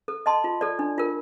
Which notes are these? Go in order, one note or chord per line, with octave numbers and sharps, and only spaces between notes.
A4
D#5 A5 C6
F4
A4 D5
D4
F4 A#4